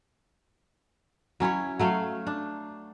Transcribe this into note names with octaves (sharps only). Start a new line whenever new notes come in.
F#3 C#4 E4 C#5
F#3 A3 C#5 F5
D4